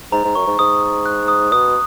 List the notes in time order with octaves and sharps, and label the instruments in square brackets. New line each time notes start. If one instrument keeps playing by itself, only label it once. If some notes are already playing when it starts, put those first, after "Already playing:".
[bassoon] G#2 [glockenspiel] A#5
[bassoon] G#2
[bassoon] F#2 [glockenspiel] C#6
[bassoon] G#2
[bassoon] G#2 [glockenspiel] D#6
[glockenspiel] D#6
F#6
D#6
[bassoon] B2 [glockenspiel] D#6